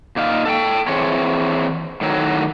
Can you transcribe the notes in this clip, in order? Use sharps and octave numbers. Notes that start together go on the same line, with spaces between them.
A#2 D#4 F5
A4 F#5 G5
E3 C4 G#4 C#5
A2 D#3 F#3